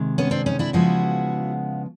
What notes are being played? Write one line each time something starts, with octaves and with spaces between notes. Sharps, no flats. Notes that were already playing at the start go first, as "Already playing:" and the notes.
Already playing: C3 D#3 G#3
B3 C#4
C4 D4
C#4 D#4
D4 E4
C#3 F3 G#3 B3 E4 F#4